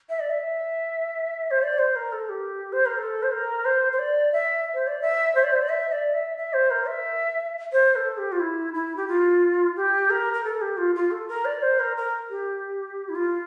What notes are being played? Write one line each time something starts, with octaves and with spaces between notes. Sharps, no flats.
E5
D5
E5
C5
D5
C5
A#4
A4
G4
C5
A#4
A4
C5
A#4
C5
C5
D5
E5
C5
D5
E5
C5
D5
C5
D5
E5
D5
E5
E5
C5
A#4
E5
C5
A4
G4
F4
E4
E4
G4
F4
G4
A#4
A#4
A4
G4
F4
F4
A4
A#4
D5
C5
A#4
A#4
G4
E4
F4